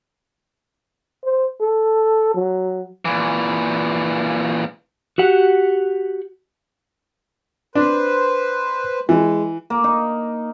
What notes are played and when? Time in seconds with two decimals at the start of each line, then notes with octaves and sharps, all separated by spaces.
1.24 C5
1.61 A4
2.35 F#3
3.05 A#2 E3
5.18 F#4 G4 F#5
7.75 D4 B4 C5
9.09 E3 G#3
9.70 A#3
9.84 D#4